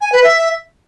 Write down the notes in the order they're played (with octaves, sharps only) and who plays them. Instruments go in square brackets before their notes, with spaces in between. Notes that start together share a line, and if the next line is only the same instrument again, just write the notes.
[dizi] G#5
B4
E5